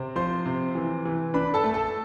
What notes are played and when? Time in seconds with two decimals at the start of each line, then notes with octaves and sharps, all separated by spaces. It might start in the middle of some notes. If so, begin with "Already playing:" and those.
Already playing: C3 C4
0.16 F3 C5 C6
0.46 C3
0.75 E3
1.05 E3
1.34 D4 B4 B5
1.54 A4 A5
1.64 A3
1.74 A4 A5